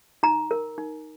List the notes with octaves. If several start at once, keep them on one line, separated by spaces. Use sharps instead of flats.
D#4 A#5
A#4
D#4